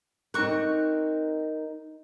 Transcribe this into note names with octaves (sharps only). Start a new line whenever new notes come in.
C4 D#4 A#4 C#6 F#6